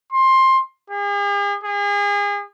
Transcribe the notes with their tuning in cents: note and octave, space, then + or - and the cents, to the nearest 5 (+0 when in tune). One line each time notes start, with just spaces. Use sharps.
C6 +15
G#4 -45
G#4 -35